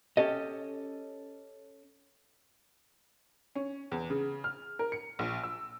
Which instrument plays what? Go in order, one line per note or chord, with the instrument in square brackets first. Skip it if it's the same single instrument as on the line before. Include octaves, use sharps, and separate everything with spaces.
[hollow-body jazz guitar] C#4 G4 A4 D#5
[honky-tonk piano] C#4
E2
C#3
F6
A#4
C#7
A#1
E6